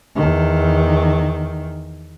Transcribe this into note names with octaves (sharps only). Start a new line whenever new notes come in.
E2 D#3